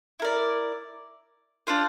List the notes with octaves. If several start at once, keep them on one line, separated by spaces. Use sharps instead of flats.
E4 A#4 D5
D4 F4 C5